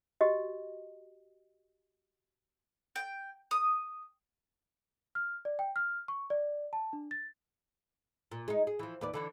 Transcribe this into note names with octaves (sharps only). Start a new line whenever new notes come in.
F#4 G4 D#5
G5
D#6
F6
D5
G5
F6
C#6
D5
A5
D4
A6
A#2
G#3 D#4
G#4
E3 F3
D#2 B4 D5
D3 E3 D4